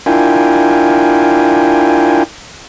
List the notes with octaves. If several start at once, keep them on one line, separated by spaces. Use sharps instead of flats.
D4 E4 F4 A#4 G5 G#5